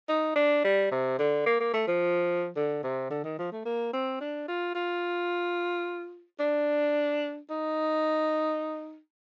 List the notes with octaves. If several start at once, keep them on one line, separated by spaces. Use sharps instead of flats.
D#4
D4
G3
C3
D3
A#3
A#3
A3
F3
D3
C3
D3
D#3
F3
A3
A#3
C4
D4
F4
F4
D4
D#4